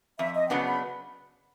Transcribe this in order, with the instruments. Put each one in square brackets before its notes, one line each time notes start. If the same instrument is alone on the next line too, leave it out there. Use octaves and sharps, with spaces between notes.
[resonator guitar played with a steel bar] F2 [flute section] E5
[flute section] D#5
G5
[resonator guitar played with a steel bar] C#3 F#3 B3 D4 [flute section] F#5
[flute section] B5